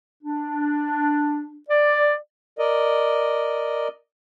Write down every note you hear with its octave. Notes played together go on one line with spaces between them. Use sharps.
D4
D5
A#4 D5 D#5